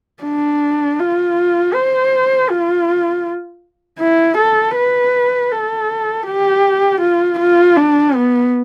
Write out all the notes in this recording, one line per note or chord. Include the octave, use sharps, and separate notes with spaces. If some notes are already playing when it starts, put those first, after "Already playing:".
D4
F4
C5
F4
E4
A4
B4
A4
G4
F4
F4
D4
B3